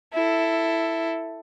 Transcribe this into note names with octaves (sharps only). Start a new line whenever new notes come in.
E4 A4